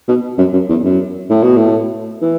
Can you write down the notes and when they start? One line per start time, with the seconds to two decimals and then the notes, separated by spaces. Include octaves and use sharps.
0.08 B2
0.38 F#2
0.53 F#2
0.69 E2
0.84 F#2
1.30 A2
1.43 B2
1.57 A2
2.22 E3